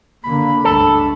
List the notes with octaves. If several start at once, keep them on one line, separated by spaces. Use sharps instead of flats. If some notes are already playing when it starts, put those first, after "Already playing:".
D3 A#3 B5
C#2 G2 A3 D4 A4